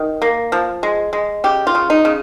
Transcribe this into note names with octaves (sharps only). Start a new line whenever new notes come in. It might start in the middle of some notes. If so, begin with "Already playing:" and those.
Already playing: D#3
A#3
F3
G#3
G#3
C#3 G4
F4
C#3
D#4
C#3